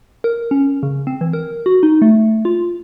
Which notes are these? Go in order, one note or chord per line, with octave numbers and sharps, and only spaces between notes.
A#4
C#4
C#3
C4
E3
A#4
F#4
D#4
A3
F4